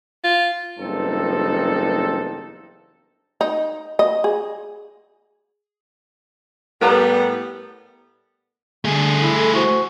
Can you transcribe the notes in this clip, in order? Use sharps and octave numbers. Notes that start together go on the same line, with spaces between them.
F4
F#1 E2 G2 C4 D#4 A4
D#4
D#5
G#4
A2 G3 B3 A#4 B4 A#5
D3 A3 G#4
E4
A4
F#4 C5